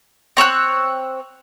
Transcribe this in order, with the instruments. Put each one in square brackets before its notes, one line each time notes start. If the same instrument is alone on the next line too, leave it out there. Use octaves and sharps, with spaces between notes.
[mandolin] C4 C#5 E6 F#6